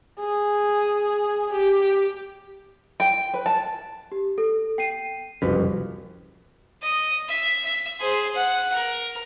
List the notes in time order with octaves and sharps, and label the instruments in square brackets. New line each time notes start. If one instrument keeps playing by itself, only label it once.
[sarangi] G#4
G4
[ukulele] G5
B4
A5
[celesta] G4
A4
G5 C7 D#7
[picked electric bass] F#1 C2 F2 [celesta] F#4 B4
[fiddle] D#5
E5
E5
G#4 C5
F#5
A#4